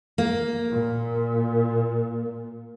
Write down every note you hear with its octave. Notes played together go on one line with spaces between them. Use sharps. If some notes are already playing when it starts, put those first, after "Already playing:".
A#3
A#2